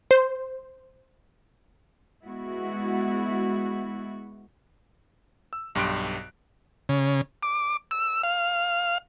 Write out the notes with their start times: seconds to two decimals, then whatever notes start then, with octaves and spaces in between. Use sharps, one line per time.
0.11 C5
2.25 G#3 B3 E4 F#4
5.53 E6
5.75 B1 G2 G4 C6 F#6 D7
6.89 C#3
7.43 D6
7.91 E6
8.23 F5